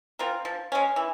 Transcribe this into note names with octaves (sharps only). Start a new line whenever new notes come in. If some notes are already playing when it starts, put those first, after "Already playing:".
C4 F4 A#4
F3
G#3 C#4
E3